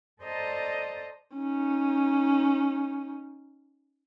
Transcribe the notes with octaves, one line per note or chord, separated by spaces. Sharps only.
A4 C5 D5 D#5 A5 A#5
C#4 D#4